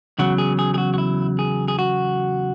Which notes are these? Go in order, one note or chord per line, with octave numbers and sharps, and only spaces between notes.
E2 C#3 F#3 F#4
G#4
G#4
G#4
F#4
F#4
E4
G#4
G#4
F#4